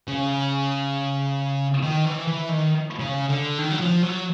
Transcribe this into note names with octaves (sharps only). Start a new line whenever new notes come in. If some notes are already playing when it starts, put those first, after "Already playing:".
C#3
D#3
E3
E3
D#3
C#3
D3
D#3
F#3
F3
F#3